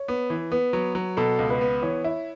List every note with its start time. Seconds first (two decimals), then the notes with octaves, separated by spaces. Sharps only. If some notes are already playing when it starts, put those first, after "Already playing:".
Already playing: C#5
0.08 B3
0.30 E3
0.52 B3 B4
0.73 F#3
0.95 F#3
1.17 B2 A4
1.39 C#2
1.50 B4
1.61 B3
1.82 E3 C#5
2.04 E4